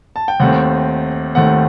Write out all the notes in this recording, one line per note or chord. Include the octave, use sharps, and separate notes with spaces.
A5
G5
D#2 D#3 A3 C4 F#5
D#2 D#3 A3 C4 F#5